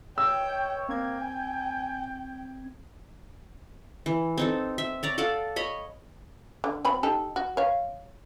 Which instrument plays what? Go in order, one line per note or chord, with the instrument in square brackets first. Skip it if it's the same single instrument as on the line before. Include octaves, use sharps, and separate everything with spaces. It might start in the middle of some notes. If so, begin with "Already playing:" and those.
[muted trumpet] C#5 [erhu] G5 [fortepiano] E6
[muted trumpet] A#3 [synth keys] C4 G#6 [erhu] G5
[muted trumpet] G#5
[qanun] E3
C4 D#4 A4
E5
C#5 D5 A#5
A4 D5 F5 F#5
C#5 D#5 B5
[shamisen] D3
F#3 C4 B5
D#4 G4 A4
F#4
C#5 F5